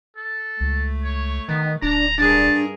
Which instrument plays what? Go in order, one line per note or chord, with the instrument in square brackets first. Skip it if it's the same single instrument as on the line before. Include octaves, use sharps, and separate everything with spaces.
[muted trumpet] A4
[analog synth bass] C#2 [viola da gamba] A3
[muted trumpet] C#5
[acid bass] D#3 [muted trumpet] B3
[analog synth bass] D1 [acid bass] D4 [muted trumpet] A#5
[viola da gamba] G2 G#4 A#4 [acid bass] D4 [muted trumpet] A5